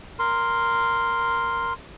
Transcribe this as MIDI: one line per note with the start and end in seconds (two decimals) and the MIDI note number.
0.19 1.73 70
0.19 1.73 84